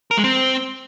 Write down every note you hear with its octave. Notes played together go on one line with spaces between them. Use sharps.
A#4
G#3
C4